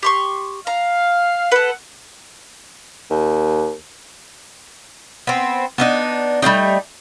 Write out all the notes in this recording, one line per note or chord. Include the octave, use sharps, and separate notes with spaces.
G4 C6 C#6
F5 A#5
A4 B4 F#5
D#2
B3 C4
B3 D4 D#4
G3 A3 C4 D#4